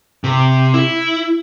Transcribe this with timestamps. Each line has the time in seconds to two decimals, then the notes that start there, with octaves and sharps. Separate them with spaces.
0.24 C3
0.74 E4